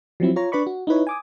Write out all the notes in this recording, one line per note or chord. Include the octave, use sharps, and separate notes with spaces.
F3 F#3 C4 E4
F4 C#5 A#5
D4 B4 D5 B5 C#6
F#4
D#4 E4 B4 C#5
G#5 D6 D#6